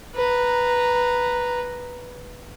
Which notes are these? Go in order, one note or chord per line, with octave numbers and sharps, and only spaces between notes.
B4 A#5